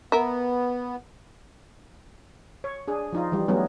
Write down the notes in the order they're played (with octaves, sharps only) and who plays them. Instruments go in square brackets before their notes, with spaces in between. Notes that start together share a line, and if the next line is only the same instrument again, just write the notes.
[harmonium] B3 [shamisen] A#4 E5
[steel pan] C#5
D4 G#4
F3 D#4 F4
E3 G3
F#3 G3 A3 B3 C#4 D#4